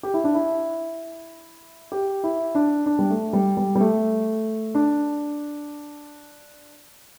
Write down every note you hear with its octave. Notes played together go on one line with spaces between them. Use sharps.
G4
E4
D4
E4
G4
E4
D4
D4
G3
A3
G3
G3
G3
A3
D4